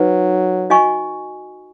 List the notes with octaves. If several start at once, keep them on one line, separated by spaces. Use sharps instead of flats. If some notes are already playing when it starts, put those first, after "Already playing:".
Already playing: F#3 D#4 B4
F#4 D#5 G#5 C#6